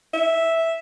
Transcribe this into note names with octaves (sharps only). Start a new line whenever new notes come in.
E5